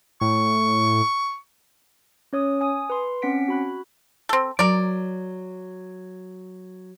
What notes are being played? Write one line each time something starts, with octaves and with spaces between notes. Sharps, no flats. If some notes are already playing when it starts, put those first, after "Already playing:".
A2 C#6
C#4 C#5 D#6
G#5 D#6
B4 C6
C4 C#4 F#5 B6 D7
F#4 B5 F#6
C4 A4
F#3 A#4 D5